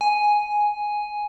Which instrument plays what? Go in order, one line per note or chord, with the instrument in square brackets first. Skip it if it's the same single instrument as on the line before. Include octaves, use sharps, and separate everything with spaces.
[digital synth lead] G#5